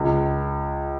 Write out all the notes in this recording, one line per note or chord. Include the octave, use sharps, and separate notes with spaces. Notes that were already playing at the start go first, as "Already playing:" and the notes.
Already playing: C#2